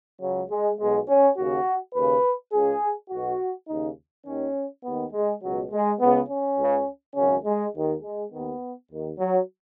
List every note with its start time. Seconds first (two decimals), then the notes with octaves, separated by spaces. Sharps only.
0.21 C#2 C#3 F#3
0.50 G#3
0.79 B1 B2 G#3
1.08 C#4
1.37 D#2 C#3 F#4
1.94 D#2 C#3 B4
2.52 C#2 C#3 G#4
3.10 B1 B2 F#4
3.68 D#2 C#3 D#4
4.26 D#2 D#3 C#4
4.84 D#2 D#3 B3
5.13 G#3
5.42 C#2 B2 F#3
5.71 G#3
6.00 C#2 C#3 B3
6.29 C#4
6.58 C#2 C#3
7.16 G#1 F#2 C#3 C#4
7.45 G#3
7.74 D#2 D#3
8.03 G#3
8.32 D#2 D#3 B3
8.90 D#2 D#3
9.19 F#3